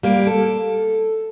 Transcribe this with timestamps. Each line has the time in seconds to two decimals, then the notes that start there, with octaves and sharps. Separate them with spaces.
0.03 G3 A#3
0.27 A4